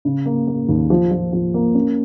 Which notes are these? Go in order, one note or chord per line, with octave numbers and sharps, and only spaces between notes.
C#3
A#3
A#3
D#2
F3
F3
F3
A#3
C#4